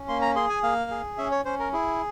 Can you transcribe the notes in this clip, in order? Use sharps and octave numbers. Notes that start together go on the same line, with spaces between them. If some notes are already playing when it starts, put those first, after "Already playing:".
Already playing: C#4
A#3 C6
A#5
G#4 C6
G#5
A#3 F5
G#4
C#4 E5
C#5
C#4 C5
A#4
E4 G#4